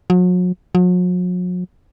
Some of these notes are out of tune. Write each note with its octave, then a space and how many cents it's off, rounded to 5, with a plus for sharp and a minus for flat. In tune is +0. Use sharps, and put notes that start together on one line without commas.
F#3 -40
F#3 -45